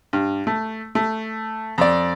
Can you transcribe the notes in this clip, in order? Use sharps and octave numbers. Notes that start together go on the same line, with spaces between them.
G2
A3
A3
F2 D5